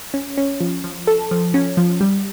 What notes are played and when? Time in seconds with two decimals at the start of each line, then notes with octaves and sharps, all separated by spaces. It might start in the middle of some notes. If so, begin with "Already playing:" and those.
0.14 C#4
0.38 C#4
0.61 F3
0.84 F3
1.07 A4
1.31 F3
1.54 C#4
1.77 F3
2.01 G3